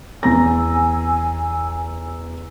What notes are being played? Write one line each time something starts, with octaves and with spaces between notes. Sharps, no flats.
E2 G#5 A#5 E6 A#6